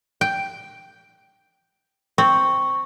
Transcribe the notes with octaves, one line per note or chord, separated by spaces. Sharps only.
G5
C4 C#6